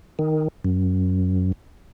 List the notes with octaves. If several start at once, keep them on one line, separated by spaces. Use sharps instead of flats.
D#3
F#2